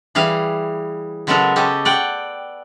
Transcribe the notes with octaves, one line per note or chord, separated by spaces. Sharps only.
E3 G3 G#4 F5
C#3 F#3 G#3 B3 A4 A#4
C#4 G4 A4 D#5
D5 F#5 G5